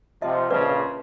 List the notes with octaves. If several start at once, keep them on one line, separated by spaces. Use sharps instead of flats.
C3 F3 D#5 E5
A#1 C#3 F3 B4 D5